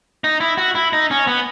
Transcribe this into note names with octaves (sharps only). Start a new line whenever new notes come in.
D#4
E4
F#4
E4
D#4
C#4
B3